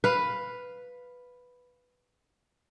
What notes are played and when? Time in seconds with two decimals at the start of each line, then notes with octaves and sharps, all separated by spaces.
0.04 B4 F5